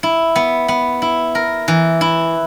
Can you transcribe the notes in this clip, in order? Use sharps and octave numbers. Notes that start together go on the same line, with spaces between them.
E4
B3
B3
E4
A#4
E3
E4